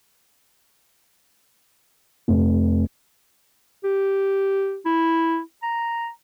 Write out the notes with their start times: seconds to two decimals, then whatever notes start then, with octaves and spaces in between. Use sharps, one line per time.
2.28 F1
3.84 G4
4.85 E4
5.63 A#5